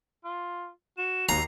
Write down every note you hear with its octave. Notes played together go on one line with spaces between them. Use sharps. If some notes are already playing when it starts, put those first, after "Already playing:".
F4
F#4 E7
D#2 A#5 C7